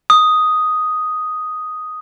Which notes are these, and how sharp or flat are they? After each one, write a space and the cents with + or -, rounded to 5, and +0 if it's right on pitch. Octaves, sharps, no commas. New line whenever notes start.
D#6 +0